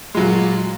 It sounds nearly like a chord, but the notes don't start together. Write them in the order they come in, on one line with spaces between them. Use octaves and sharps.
G#3 F#3 A#2